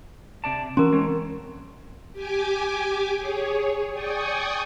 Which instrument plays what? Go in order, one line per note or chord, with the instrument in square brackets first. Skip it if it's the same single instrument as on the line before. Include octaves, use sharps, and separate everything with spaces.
[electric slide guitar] C3 D5 A5
[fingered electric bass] E3 C#4 [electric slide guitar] F#4 [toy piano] A#4 A#5 C6
[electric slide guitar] G#3 C4 C#5
[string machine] G4 G#5 D6
G#4 C#5
D5 G5 G#5 C#6 D#6